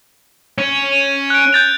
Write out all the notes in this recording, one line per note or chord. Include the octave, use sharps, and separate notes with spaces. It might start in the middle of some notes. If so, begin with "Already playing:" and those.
C#4
F#6 D7
G6 A6 F7